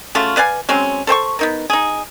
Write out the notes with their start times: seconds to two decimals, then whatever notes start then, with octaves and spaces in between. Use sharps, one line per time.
0.15 C#3 A3 F4 F#4
0.37 B4 D5 F5 G#5
0.69 F#3 G#3 C4 C#4
1.07 A4 C5 G5 C#6
1.39 B3 D#4 A#4
1.70 D#4 G#4